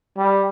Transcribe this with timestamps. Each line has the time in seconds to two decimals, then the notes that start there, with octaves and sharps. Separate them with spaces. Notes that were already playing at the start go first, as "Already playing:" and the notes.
0.18 G3